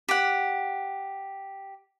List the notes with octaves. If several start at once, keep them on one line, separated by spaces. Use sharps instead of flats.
G4 F#5